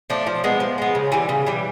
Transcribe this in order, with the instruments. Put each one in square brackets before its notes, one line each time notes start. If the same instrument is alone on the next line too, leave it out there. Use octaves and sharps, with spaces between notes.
[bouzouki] F3 A3 D4
F3
G#3 B3
F3
G#3 B3
C#3
E3 G3
C#3
E3 G3